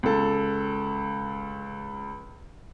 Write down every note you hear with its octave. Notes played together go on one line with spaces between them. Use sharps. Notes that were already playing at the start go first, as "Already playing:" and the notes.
C#2 A4